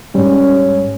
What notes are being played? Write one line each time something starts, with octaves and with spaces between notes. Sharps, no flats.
G#2 G3 C#4